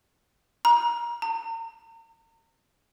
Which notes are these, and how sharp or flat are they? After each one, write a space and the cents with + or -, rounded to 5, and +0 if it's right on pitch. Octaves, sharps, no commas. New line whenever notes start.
A#5 +30
A#5 -40